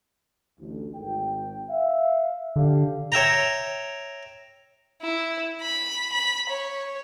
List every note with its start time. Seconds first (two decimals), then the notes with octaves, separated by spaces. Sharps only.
0.59 A1 D2
0.95 G#1 G5
1.70 E5 F5
2.56 D3 G4 D5 F5
3.12 C#5 E5 G5 A#5
5.02 E4
5.61 B5
6.13 B5
6.50 C#5